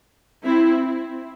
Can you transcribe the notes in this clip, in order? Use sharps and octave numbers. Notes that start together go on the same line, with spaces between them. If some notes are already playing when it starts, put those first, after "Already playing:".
C4 E4